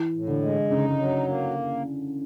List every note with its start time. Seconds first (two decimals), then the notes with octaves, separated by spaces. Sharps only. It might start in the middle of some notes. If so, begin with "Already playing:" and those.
Already playing: E3
0.13 A2
0.28 D3
0.42 G#3
0.70 C#3 D#4
0.99 F#3
1.27 A#3